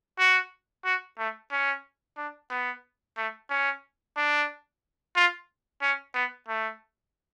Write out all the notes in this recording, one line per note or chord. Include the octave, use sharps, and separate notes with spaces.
F#4
F#4
A3
C#4
D4
B3
A3
C#4
D4
F4
C#4
B3
A3